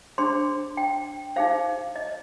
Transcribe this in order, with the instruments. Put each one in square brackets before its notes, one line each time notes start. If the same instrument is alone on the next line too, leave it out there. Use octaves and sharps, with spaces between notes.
[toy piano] D4 G#4 C5 C6
G5
D#4 G#4 C5 F5
D#5